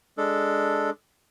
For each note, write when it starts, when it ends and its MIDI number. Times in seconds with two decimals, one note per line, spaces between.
0.18 0.90 56
0.18 0.90 62
0.18 0.90 69